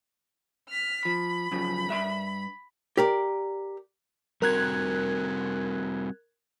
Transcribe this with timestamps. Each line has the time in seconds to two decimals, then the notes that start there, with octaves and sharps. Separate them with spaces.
0.69 F6 B6
1.05 F3 B5
1.51 F#2 C#3 F3
1.89 G2 E5 C6
2.97 G4 A#4 D5
4.42 G3 C4 F#4 A#4 F#6 G#6